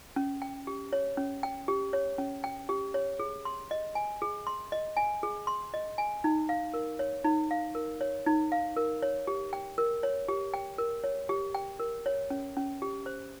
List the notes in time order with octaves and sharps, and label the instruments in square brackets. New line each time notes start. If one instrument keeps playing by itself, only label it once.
[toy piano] C#4
G5
G4
C#5
C#4
G5
G4
C#5
C#4
G5
G4
C#5
G#4
C6
D#5
G#5
G#4
C6
D#5
G#5
G#4
C6
D#5
G#5
D#4
F5
A#4
C#5
D#4
F5
A#4
C#5
D#4
F5
A#4
C#5
G4
G5
A#4
C#5
G4
G5
A#4
C#5
G4
G5
A#4
C#5
C#4
C#4
G4
C5